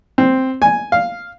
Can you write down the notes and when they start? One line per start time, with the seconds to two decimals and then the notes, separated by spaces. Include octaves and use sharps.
0.18 C4
0.62 G#5
0.92 F5